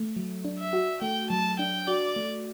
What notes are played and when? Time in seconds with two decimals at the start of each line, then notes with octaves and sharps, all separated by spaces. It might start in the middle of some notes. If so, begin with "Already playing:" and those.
Already playing: A3
0.16 F#3
0.45 D4
0.59 E5
0.73 F#4
1.02 A3 G5
1.30 F#3 A5
1.59 D4 G5
1.87 F#4 D5
2.16 A3